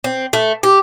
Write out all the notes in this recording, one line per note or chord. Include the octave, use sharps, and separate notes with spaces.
C4
A3
G4